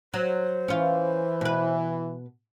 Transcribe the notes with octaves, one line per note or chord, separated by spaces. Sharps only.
F#3 C5
E3 C#4 F4
B2 B4